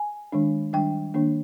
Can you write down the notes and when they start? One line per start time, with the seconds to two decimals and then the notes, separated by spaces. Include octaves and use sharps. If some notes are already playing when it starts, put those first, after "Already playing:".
Already playing: G#5
0.32 D#3 G#3 D4
0.73 D#3 G3 D4 G5
1.14 D#3 A#3 D4